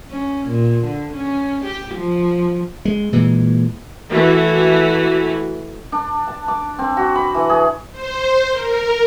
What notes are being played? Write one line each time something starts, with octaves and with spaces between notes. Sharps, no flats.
C#4
A#2
D3
C#4
G4
F3
G#3
A#2 E3 G#3
E3 A3 F#4
D4
A5
D6
C4
F#4
B5
E3
G#4
C5
A#4